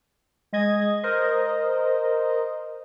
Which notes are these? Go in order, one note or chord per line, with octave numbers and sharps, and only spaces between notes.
G#3 D#5 G#6
A#4 C5 D#5